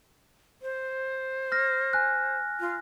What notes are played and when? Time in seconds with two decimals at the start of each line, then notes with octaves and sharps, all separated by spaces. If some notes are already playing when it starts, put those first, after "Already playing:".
0.62 C5
1.52 F6 A#6
1.93 G#5 F#6
2.60 F4